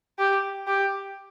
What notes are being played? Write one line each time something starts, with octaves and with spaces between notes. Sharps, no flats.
G4
G4